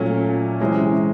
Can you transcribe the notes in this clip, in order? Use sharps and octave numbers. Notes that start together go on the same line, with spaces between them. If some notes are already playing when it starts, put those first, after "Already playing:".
Already playing: A#2 F#3 A3 C#4
C3 E3 G#3 C#4